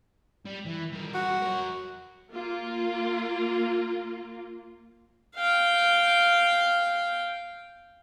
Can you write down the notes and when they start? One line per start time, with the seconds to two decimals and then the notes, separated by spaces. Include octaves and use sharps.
0.45 G3
0.66 E3
0.92 G3 A#3
1.15 F#4
1.42 A#4 C#5
2.31 A#3 F4
5.35 F5 G5